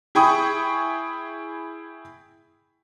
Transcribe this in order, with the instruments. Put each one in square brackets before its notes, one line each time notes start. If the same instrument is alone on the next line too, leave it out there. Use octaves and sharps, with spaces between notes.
[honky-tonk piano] E4 G#4 G5 B5 C#6 D#6